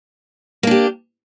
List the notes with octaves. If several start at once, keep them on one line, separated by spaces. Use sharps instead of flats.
A#3 D4 G4